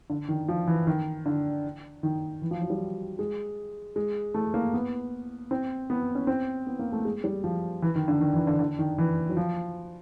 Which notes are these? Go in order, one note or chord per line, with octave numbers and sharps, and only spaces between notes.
D3
D#3
F3
E3
D#3
D3
D#3
E3
F3
F#3
G3
G#3
G#3
A3
A#3
B3
C4
B3
C#4
C4
B3
A#3
A3
G#3
G3
F3
E3
D#3
D3
D#3
E3
D3
D3
D#3
E3
F#3
F3